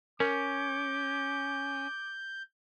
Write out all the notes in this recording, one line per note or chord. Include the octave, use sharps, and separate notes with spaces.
C#4 A#4 D6 G6